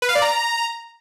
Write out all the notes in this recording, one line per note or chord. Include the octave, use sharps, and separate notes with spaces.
B4
F5
D5
A#5